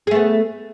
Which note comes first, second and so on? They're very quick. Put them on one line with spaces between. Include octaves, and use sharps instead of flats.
G#4 A3 B3